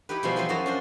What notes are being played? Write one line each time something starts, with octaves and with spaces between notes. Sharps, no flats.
D#4 E4 G4 B4
B2 F3 G3 G#3
E3 F#3 C4 B4 C5
F#2 F3 F#4 D#5 A5 A#5
C#4 D4 C5